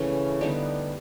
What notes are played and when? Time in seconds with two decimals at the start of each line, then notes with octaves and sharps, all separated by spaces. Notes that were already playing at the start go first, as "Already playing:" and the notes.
Already playing: C#3 E3 A3 C#4
0.41 D3 G3 B3 D#4 G4